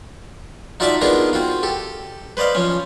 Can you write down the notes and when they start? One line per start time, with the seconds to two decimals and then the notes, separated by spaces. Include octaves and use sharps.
0.80 D#4 F4 F#4 D5 E5 A5
1.01 B3 D4 D#4 F4 G#4 A#4
1.33 C4 F4 F#4
1.63 G4 A4
2.37 B4 C5 D5 D#5 F5
2.55 F3 C#4